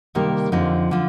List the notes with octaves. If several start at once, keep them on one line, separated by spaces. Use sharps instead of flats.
C3 D#3 G3 A#3
F2 D3 F3 C4 D#4
D3 F3